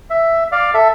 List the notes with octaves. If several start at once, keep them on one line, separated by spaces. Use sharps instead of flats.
E5
D5 F5
A4 E5